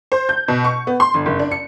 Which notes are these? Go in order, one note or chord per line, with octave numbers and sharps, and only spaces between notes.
C5
G6
B2
C#6
B3
C6
G1
F#1
D4
C#7